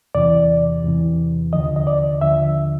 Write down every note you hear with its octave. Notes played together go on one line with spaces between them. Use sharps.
E2 C3 E3 D5
E2 C3 E3
D#2 D3 F3 D#5
D#5
D5
D#2 D3 F3 E5